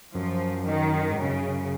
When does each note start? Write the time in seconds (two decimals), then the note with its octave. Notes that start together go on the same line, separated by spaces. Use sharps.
0.14 F#2 F3
0.67 D#3
1.10 G#2
1.18 F#2 C#3